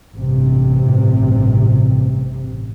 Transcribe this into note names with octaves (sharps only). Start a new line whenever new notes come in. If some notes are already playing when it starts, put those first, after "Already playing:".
A1 G2 C3